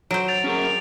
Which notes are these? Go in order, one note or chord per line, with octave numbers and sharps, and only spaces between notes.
F#3 C5 D7
A6 D7 F7
C#4 G#4 A#4